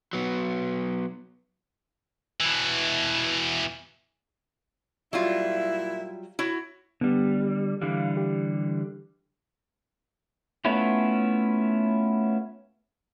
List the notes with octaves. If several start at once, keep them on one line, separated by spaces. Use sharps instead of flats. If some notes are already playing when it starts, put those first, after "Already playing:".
F#3 B3
B2 E3
A#2 F#3 G3 E4 F4
E4 F#4 C#5
D3 G3 B3
D3 E3 G3 F5
G4
A3 B3 C#4 E4 F4